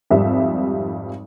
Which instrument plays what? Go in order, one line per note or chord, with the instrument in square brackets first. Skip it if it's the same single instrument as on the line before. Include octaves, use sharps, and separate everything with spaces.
[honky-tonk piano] G#1 F2 G3 E5